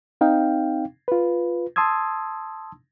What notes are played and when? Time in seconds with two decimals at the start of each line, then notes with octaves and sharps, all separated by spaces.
0.21 C4 D#4 F5 G5
1.08 F4 B4
1.76 A5 C6 D#6 E6 G#6